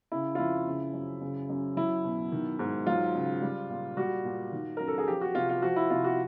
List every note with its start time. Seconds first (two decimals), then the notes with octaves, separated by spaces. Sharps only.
0.12 C#3 E4
0.35 F4
0.38 F2 E4
0.66 C#3
0.94 F#2
1.21 C#3
1.49 F#2
1.77 F#3 E4
2.04 B2
2.32 D#3
2.59 G#2
2.87 F#3 F4
3.15 C#3
3.42 G3
3.70 A#2
3.97 G3 F#4
4.25 A#2
4.52 D#3
4.77 F#2 A#4
4.88 A4
4.98 G#4
5.07 F3 G4
5.21 F#4
5.35 C3 F4
5.49 F4
5.62 F3 F#4
5.76 E4
5.90 C3 F4
6.04 F#4